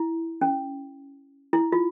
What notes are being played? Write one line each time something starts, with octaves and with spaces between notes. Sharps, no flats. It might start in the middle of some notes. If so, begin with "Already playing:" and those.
Already playing: E4
C#4
E4
F4